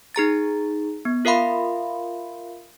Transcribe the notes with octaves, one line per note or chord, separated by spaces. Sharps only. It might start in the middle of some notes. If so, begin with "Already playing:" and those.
D#4 G#4 A#5 A6
B3
F4 A#4 E5 F5 B5 C6